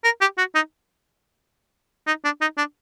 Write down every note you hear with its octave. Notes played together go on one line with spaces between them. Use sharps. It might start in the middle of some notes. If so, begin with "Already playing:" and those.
A#4
G4
F#4
D#4
D#4
D4
D#4
D4